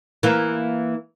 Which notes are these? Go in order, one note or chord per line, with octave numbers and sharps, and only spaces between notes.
E3 A#3